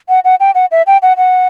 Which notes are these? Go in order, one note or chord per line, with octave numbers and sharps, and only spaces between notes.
F#5
F#5
G5
F#5
E5
G5
F#5
F#5